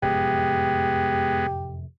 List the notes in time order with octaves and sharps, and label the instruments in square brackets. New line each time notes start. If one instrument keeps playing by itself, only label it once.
[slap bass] F1 F#2 A2 [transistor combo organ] G#3 B3 [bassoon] G4